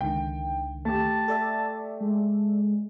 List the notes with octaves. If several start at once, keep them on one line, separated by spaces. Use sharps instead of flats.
C#2 D3 D#3 G5
A3 G4 A5
A4 D5 E5
G#3